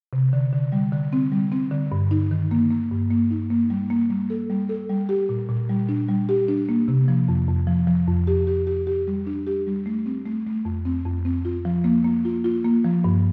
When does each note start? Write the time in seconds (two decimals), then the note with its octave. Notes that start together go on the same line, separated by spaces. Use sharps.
0.13 C3
0.33 D3
0.52 D3
0.72 G3
0.92 D3
1.13 C4
1.32 G3
1.52 C4
1.71 D3
1.92 G2
2.11 D#4
2.31 D#3
2.51 A#3
2.71 A#3
2.91 G2
3.11 A#3
3.31 D#4
3.50 A#3
3.70 G3
3.90 A#3
4.10 G3
4.30 A4
4.50 G3
4.69 A4
4.89 G3
5.09 G4
5.29 A#2
5.49 A#2
5.69 G3
5.89 D4
6.08 G3
6.29 G4
6.48 D4
6.69 A#3
6.88 C3
7.08 F3
7.28 F2
7.48 F2
7.67 F3
7.87 F3
8.08 F2
8.27 G4
8.47 G4
8.67 G4
8.87 G4
9.07 G3
9.27 D4
9.47 G4
9.67 G3
9.86 A3
10.06 C4
10.26 A3
10.46 A3
10.65 F2
10.85 C4
11.05 F2
11.25 C4
11.45 F4
11.65 F3
11.84 A#3
12.04 A#3
12.25 F4
12.44 F4
12.64 A#3
12.85 F3
13.04 G2